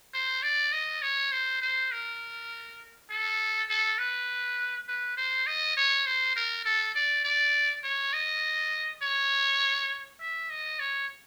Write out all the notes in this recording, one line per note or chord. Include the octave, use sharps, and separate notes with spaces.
C5
D5
D#5
C#5
C5
C5
A#4
A4
A4
B4
B4
C5
D#5
C#5
C5
A#4
A4
D5
D5
C#5
D#5
C#5
E5
D#5
C#5